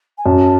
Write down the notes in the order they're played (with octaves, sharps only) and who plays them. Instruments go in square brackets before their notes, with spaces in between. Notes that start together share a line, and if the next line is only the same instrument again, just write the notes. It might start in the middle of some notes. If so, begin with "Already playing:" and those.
[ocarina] G#5
[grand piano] F#2 [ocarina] A5